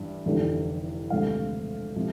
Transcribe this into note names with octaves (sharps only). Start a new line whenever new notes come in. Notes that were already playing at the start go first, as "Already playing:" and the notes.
Already playing: A1 G2
F1 E2 D3 G3
E1 D2 C3 F3 A3 F5
C3 F3